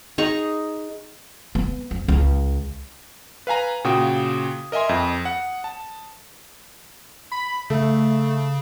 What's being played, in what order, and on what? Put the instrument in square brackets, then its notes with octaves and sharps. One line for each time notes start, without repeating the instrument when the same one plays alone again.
[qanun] D#4 G#4 A#5 C#6
[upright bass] B3
F2
C#2
[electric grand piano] B4 F5 G#5 A#5
A#2 C#3 F#4 G5 D#6
A#4 D#5 E5 G#5 C6
F2
F#5
A5
[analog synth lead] B5
[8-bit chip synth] C#3 [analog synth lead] A3